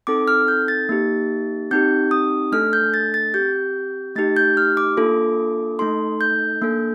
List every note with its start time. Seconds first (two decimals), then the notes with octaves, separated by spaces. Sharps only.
0.07 C4 D#4 A4 D6
0.28 F6
0.48 G6
0.68 A6
0.89 A#3 D#4 G4
1.71 C4 D#4 G4 G6
2.11 D#6
2.52 A3 D4 A4 F6
2.73 G6
2.94 A6
3.14 A6
3.34 C4 G4 G6
4.15 A3 D#4 G4 A6
4.37 G6
4.57 F6
4.77 D6
4.97 A#3 D4 F4 A4
5.79 A3 D#4 A4 C6
6.21 G6
6.62 A#3 D4 A4